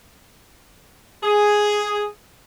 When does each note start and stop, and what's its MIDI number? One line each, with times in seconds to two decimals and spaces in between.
1.23 2.06 68